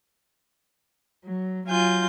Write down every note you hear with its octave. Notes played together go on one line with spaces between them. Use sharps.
F#3
F#3 F4 G#5 G6